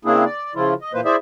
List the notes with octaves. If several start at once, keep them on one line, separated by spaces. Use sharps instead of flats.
C#3 A#3 C4 D4 E4 G#4
D5
C#3 F3 E4 F4
D#5
A#2 E3 A#3 B4 C5
E4 G#4 C5 D5 E5